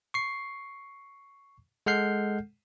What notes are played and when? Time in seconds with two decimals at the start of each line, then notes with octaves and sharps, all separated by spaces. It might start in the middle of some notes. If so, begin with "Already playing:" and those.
0.14 C#6 C7
1.86 G#3 A4 F#5 F6 G6 C7